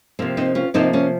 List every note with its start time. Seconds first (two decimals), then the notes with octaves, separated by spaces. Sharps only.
0.19 C3 F3 A#3 C4
0.37 C4 D#4
0.55 C#4 F4
0.74 C3 F3 A#3 C4 D#4
0.93 A#3 C#4